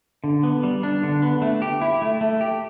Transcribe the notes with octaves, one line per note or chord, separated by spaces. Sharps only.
D3
B3
G3
D4
D3
B3
A3
G4
E4
A3
A3
G4